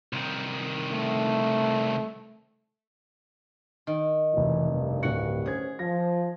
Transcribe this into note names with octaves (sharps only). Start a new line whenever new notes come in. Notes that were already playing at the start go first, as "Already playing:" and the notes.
C2 D#3
A3
D#3
F1 B2 E3
C2 G2
D1 F#4 C#7
C#4 G#4 C5 G#6
F3 A#6